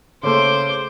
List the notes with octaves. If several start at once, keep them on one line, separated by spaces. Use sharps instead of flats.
C#3 A3 C5 D6